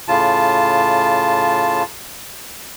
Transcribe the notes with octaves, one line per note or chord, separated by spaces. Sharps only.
A2 C#3 F4 A5